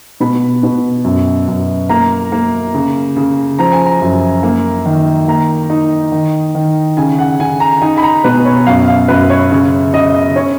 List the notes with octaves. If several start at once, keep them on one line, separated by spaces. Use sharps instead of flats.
B2 B5
B2
F#2
F#2
A#3 A#5
A#3
C#3
C#3
F3 A#5
G#5
A#5
F#2
A#3
D#3
A#3 A#5
D#4
D#3
D#3
C#3 G#5
F#5
C#3 G#5
A#5
D#4 G#5
B5
A#5
B2 B4
C#5
F#2 F5
F5
F#2 B4
C#5
C#3
C#3 D#5
C#4 C#5